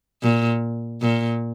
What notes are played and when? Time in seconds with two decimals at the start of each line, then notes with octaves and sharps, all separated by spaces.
0.23 A#2
1.02 A#2